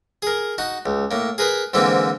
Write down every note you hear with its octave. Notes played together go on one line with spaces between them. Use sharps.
G#4 A#4
D#4 F#4
C#2
A2 A#3
G#4 A#4 B4
G#2 D3 E3 A#3 C4 E4